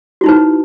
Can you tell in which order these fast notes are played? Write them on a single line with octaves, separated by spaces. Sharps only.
F#4 E4 D#4 B4